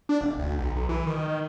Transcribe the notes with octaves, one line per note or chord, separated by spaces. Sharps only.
D4
E1
D2
B1
B1
E3
D#3
D#3